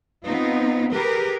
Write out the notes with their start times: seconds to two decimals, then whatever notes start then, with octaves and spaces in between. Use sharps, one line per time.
0.23 B3 C4 D#4 F4
0.91 G4 G#4 A#4 B4